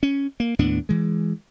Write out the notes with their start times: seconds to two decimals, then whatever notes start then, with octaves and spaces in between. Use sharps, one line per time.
0.03 C#4
0.40 A#3
0.59 D#2 A2 B3 D4
0.89 E3 G#3